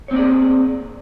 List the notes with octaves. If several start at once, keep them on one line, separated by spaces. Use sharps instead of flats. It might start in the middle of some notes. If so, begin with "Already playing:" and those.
A#3 C4 G#4 C#5 D5